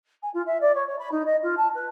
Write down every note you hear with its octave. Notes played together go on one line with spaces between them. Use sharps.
G#5
F4
E5
D5
C#5
C#5
B5
D#4
D#5
F4
A5
B4